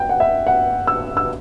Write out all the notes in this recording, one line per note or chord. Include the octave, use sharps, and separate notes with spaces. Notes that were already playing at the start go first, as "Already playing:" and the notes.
Already playing: G5
F#5
E5
F#5
E6
E6